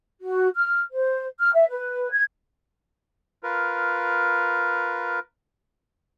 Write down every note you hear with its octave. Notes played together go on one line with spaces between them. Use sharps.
F#4
F6
C5
F6
E5
B4
G#6
F4 A#4 B4